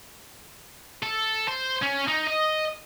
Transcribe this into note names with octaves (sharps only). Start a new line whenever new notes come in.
A4
C5
C#4
D#4
D#5